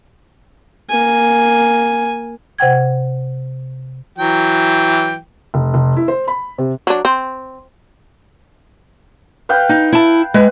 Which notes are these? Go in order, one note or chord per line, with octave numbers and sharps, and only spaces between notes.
A#3 G#5
C3 F#5 G5 G#6
E3 F#3 G5
F1
F1
E4
C5
B5
C3
F#3 D4
C4
B4 F5 G5
D#4
E4 A5
G#3 B4